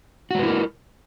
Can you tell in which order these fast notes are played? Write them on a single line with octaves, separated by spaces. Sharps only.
F#4 G#3 B4 E4 A#4